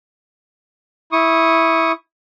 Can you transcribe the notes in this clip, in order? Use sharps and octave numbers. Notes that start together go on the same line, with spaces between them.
E4 C#6 D#6